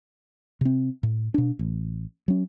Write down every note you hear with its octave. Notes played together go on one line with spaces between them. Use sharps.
C3 C4
A2
B2 D4
A1
F#3 C#4